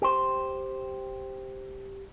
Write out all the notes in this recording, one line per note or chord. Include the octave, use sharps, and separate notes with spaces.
G4 C5